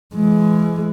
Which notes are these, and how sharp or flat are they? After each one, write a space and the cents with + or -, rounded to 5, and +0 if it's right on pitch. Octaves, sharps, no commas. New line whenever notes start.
E3 +35 G#3 +25